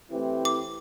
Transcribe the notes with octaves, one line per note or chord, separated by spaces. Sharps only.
E3 A3 C4 E4 G4
D6